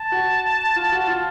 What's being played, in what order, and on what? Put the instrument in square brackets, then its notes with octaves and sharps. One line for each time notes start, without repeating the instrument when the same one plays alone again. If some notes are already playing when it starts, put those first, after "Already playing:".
Already playing: [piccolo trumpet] A5
[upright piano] F#4
F4
F#4
F4